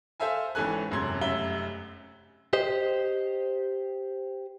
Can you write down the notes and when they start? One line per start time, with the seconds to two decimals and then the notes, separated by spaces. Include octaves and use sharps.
0.20 A4 C5 E5 F5 G#5
0.55 G#1 E3 C#4 A4 G#5 F#6
0.91 E1 F#2 C3 C6 G#6
1.21 F1 F#2 E5 G7
2.53 G4 C5 D#5